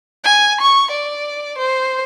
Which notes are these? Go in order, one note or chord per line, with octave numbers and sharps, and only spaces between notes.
G#5
C#6
D5
C5